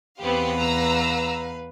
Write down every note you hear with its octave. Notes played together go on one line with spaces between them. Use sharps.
E2 B3 C4 G4 B4 F5
A#5 E6